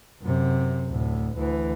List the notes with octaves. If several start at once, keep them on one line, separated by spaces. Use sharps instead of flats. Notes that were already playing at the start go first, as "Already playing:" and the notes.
F#2 C3
D2 A2
D2 E3